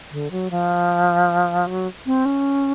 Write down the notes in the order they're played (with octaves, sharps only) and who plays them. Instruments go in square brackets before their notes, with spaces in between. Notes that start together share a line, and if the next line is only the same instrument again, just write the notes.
[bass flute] D3
F#3
F3
F#3
C4
C#4